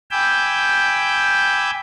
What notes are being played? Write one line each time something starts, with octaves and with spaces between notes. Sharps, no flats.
G5 G#5 B5 D6 E6 G6